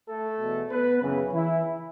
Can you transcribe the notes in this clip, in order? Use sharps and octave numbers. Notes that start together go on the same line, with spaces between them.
A3 A4
E2 B2
B3 B4
F#2 C#3 E3
E3 E4